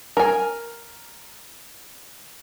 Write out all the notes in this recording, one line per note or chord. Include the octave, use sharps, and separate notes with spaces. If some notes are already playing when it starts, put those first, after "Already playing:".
A#4 G#5